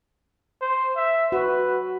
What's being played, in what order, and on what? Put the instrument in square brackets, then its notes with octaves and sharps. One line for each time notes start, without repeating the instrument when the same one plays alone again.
[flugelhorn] C5
E5
[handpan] F#4 [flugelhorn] B4